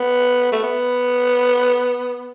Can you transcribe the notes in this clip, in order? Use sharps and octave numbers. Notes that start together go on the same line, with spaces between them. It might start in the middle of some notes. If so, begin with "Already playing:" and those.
Already playing: B3
A3
B3